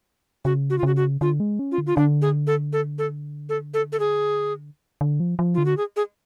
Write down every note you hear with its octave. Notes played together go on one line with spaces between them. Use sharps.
C#3 F#4
F#4
F4
C#3 F#4
F#4
D3 F4
G#3
C#4
F4
D3
F4
D3 D4
G#4
A4
A4
A4
A4
A4
A4
G#4
D3
F3
F3
D3 F4
F#4
G#4
G#4